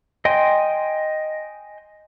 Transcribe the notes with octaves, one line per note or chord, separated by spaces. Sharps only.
D#5 G5 G#5 C6